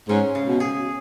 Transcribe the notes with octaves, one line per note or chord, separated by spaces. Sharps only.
G#2 C#4
C#3
B2
G#4